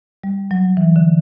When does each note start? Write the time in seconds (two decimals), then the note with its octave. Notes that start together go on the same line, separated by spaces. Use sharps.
0.24 G3
0.51 F#3
0.77 E3
0.96 D3